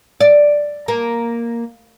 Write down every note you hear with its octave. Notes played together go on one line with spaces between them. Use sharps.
D5
A#3